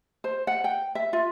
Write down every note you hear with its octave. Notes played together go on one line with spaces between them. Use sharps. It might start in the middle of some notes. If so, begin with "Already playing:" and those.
C5
F#5
G5
E5
F4